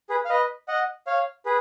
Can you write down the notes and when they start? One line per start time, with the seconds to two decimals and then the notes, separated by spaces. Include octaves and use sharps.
0.10 G#4 B4
0.25 F5
0.30 B4 D#5
0.68 D#5 F#5
1.07 C#5 F5
1.46 G#4 B4